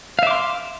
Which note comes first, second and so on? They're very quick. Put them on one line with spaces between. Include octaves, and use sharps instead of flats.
F5 E5 D6 C6